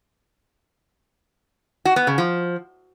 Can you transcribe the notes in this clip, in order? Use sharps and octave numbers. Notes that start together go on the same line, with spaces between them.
F#4
B3
C#3
F3